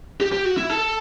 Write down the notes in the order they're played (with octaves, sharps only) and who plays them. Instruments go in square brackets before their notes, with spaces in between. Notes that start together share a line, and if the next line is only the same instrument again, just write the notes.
[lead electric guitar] G4
G4
F#4
E4
A4